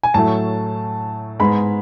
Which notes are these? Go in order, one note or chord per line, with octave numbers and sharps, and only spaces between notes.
G#5
A2 F#3 A3 A5
G#2 G#3 B3 B5